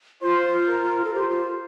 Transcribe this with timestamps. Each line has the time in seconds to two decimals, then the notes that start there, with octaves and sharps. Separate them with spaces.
0.22 F4 C5
0.69 A#4
1.05 A4
1.14 G4 C5
1.29 F4